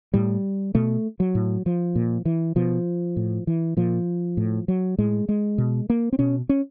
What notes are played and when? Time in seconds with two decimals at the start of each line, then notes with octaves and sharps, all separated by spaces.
0.14 A2 G3
0.75 B2 A3
1.20 F#3
1.35 A2
1.66 F3
1.95 A#2
2.25 E3
2.56 B2 F3
3.17 A2
3.47 E3
3.77 A#2 F3
4.37 A2
4.68 F#3
4.98 A2 G#3
5.29 G#3
5.58 B2
5.90 A#3
6.13 C4
6.19 B2 C#4
6.49 C#4